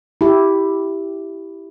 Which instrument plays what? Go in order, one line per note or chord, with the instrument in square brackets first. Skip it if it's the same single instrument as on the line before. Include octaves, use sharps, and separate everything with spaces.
[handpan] E4 G4